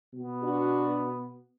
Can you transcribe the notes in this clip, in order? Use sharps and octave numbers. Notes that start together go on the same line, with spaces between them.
B2 B3
D4 F#4